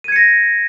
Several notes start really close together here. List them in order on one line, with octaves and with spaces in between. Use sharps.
D#7 G#6 C#7 A#6